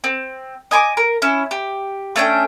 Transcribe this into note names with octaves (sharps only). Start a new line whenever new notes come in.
C4
D#5 G#5 B5 D6
A#4
C#4 E4
G4
A3 C#4 D4 G5